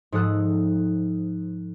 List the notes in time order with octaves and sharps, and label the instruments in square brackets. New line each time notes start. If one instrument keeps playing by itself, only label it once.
[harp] G#2 F3 A4 D#6 F#6